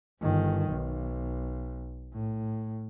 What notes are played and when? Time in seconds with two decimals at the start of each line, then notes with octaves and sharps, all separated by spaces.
0.21 G1 D#3
0.69 B1
2.13 A2